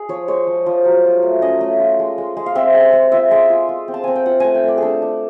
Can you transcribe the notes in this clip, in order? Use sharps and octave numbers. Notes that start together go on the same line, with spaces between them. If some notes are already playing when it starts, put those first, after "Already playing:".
Already playing: G#4
F3 C#5
G#3 C#5
F3
F3
F#3
F4
A3
C#4 D#5
A3
F4
G#3
G#3
G#3
F5
C4 E5
G#3
G#3
F4 E5
G#3
F4
F4
C4
A5
C4 G#5
G5
F4 F#5
A3 G#5
G5
A3 D5
D4 G#4 A4
D4